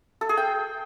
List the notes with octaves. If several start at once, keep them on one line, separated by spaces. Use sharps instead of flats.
A4
G#4
G5